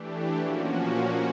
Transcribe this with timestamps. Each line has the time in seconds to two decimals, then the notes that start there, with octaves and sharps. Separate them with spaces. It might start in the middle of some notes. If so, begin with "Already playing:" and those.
Already playing: E3 A3 D4 G4
0.38 A#2 F3 A#3 C#4 F#4